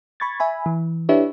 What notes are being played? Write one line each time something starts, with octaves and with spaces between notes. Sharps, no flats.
B5 C#6 G#6 A6
E5 G#5 B5
E3
D4 E4 G4 B4 C#5 E5